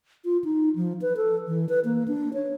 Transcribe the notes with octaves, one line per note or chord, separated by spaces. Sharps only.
F4
D#4
F3
B4
A4
E3
B4
A#3
D4
C#5